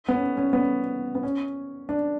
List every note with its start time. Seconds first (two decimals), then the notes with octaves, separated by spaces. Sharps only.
0.08 B3
0.15 C#4
0.37 C#4
0.53 B3
0.58 C#4
1.15 B3
1.23 C#4
1.89 D4